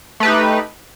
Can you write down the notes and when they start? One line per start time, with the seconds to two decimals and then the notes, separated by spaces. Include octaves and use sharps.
0.20 A3
0.23 B4
0.25 G4
0.28 D#4